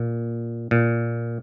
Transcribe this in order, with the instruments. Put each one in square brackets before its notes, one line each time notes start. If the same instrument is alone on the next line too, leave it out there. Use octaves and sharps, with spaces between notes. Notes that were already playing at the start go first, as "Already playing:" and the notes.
Already playing: [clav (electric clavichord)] A#2
A#2